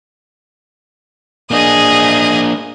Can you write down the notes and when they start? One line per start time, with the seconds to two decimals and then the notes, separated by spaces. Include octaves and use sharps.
1.51 A#3 D4 G#4 D#5